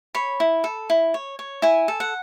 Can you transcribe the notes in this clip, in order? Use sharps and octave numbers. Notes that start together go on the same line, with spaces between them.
C#5 B5
E4
A4
E4
C#5
C#5
E4 G#5
A4
F#5